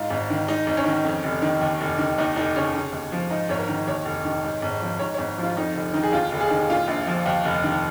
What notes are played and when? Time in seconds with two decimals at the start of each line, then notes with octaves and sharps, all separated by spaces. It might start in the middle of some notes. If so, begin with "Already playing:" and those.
Already playing: G#2 F4
0.10 G#1
0.30 D#3
0.48 G#2 D#4
0.67 G#1
0.77 C#4
0.86 D#3
1.05 F2
1.24 F1
1.42 D#3
1.61 D#2
1.81 F1
1.98 D#3
2.18 D#2 D#4
2.36 F1 D#4
2.55 C#3 C#4
2.74 C#3
2.93 D#2
3.12 F3
3.30 G#2 D#4
3.49 G#1 C#5
3.59 A#4
3.69 D#3
3.87 D#2 C#5
4.05 F1
4.25 D#3
4.44 G#2
4.62 G#1
4.82 F3
4.99 G#2 C#5
5.14 G#1 C#5
5.38 F3 F4
5.57 F2 D#4
5.75 F1
5.93 D#3 D#4
6.03 G#4
6.12 D#2 F4
6.32 F1
6.41 G#4
6.51 D#3
6.69 A#2 F4
6.88 A#1
7.07 F3
7.26 D#2
7.45 F1
7.64 D#3